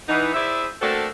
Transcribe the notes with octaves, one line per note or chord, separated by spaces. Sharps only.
E3 B3 D#4
E4 G#4 C5 D5 E5
A3 A#3 C4 D4 F#4 A4